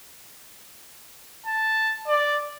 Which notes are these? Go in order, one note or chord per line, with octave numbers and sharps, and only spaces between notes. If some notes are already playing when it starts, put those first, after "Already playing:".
A5
D5